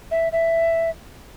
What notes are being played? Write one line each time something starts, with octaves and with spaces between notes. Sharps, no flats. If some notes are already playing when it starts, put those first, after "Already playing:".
E5
E5